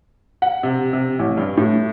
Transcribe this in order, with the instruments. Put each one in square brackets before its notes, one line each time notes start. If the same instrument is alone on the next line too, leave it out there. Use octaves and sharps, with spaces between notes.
[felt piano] F#5
C3
C3
A1
G2
A2